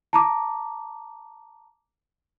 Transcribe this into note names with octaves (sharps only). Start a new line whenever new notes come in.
A5 A#5 D6